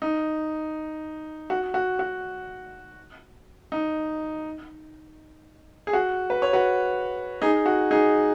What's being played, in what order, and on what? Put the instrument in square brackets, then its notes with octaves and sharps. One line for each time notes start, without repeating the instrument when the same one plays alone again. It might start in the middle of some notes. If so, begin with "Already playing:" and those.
[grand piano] D#4
F#4
F#4
F#4
D#4
G#4
F#4
B4
C#5
F#4 B4
D#4 G#4
F#4
D#4 G#4